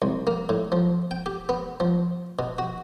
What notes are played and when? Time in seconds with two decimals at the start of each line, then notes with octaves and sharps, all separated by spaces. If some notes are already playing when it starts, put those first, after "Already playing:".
0.02 C2
0.27 A#3
0.49 A2
0.72 F3
1.11 G5
1.26 G4
1.49 B3
1.80 F3
2.39 B2
2.58 F#4